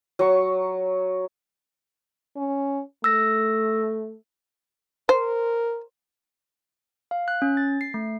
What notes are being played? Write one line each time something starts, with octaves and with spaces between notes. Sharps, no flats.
F#3 C#6
C#4
A3 E6 A#6
A#4 C5
F5
F#6
C#4
A6
C7
A3